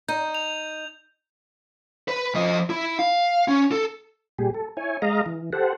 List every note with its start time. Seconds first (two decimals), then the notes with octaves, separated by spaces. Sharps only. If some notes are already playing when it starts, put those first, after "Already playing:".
0.09 D#4 G6
0.35 F7
2.08 B4
2.34 F3 D#5
2.70 E4
2.99 F5
3.48 C#4
3.72 A4
4.39 A#2 G3 G4 G#4
4.54 A4
4.77 E4 C#5 G#5
5.02 G#3 D#5 F5 A#5
5.26 E3
5.53 G4 A4 C5 F#5